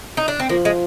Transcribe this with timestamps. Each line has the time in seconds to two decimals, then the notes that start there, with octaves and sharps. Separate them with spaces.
0.17 D#4
0.28 D4
0.40 C4
0.49 F3 A#3
0.65 G#3